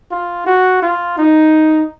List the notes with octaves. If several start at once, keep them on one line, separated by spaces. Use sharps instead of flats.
F4
F#4
F4
D#4